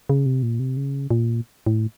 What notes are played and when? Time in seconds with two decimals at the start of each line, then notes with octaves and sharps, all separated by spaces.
0.10 C#3
0.26 C3
0.43 A#2
0.59 C3
0.77 C#3
1.11 A#2
1.67 A2